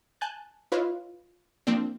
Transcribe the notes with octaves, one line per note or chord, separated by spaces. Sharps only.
G#5 A5 F#6 G6 A6
E4 F4 B4 C#5 D#5 F5
F3 A#3 C4 D4